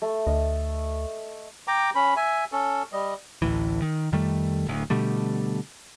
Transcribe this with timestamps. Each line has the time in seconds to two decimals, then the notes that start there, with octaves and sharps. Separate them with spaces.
0.02 A3
0.27 D2 D#5
1.68 G5 A#5 D6
1.95 C#4 B5
2.16 E5 G#5
2.52 C#4 A4
2.92 G3 D#5
3.42 A1 D2 A2 E3
3.82 D#3
4.12 F2 D#3 G3 A3
4.67 D1 D2
4.90 B2 D3 G3 A3